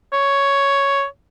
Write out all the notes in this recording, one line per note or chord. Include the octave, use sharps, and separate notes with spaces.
C#5